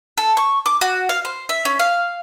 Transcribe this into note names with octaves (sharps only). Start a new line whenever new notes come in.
A4
C#6
D6
F#4
F5
C5
E5
C#4
F5